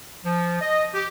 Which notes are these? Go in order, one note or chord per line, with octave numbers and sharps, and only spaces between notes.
F3
D#5
G4